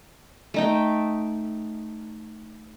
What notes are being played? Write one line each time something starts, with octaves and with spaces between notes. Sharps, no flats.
A3 D#4 G5